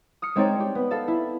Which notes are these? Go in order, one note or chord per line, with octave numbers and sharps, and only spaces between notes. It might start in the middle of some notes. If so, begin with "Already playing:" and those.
D#6 F6 C#7
G#3 C4 D#4 C#5 D5 G5
G4
B3
A4 F5 A5
E4